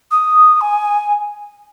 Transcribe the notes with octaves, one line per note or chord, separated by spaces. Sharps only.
D#6
G#5